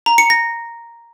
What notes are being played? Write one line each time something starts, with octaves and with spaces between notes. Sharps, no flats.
A#5
C#7
A#6